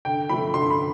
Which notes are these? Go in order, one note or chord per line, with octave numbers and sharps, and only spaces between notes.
D3 G5
F3 A3 B5
D3 C6
B5